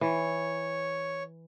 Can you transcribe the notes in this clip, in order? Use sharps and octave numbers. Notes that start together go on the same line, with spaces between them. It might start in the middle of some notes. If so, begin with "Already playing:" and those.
E3 C#5